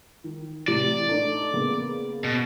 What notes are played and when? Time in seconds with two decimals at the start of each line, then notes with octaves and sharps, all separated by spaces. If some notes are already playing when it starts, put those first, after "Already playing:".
0.24 D#3
0.68 A2 C3 E3 D5
1.09 A3 D4 D#4
1.53 C#3 A#3 B3
2.24 B2